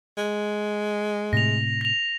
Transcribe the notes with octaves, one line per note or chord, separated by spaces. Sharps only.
G#3
A2 C3 A#6 F7
A#6 F7